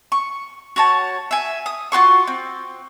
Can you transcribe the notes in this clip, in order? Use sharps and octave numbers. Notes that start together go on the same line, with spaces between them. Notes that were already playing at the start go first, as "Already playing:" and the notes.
C#6
F#4 C#5 A5
E5 G#5
D#6
F4 F#4 C6 C#6
C4